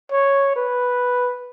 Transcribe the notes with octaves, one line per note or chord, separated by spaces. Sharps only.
C#5
B4